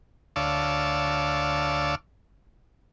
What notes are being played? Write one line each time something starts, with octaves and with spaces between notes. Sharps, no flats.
D2 C#5 D5 F5 A5 E6